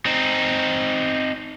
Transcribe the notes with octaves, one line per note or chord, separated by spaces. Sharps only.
C4 D#4